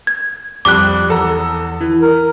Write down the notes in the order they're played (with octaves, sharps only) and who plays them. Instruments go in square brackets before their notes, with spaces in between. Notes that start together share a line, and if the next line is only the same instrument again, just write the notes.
[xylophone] G#6
[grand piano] F2 G3 G7 [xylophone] D6 F#6
[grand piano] E2 A4 A#5
E3
[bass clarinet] A#4